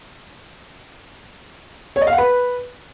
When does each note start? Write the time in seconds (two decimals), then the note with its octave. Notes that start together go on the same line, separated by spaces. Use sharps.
1.96 C#5
2.01 D#5
2.07 F5
2.13 F#5
2.18 B4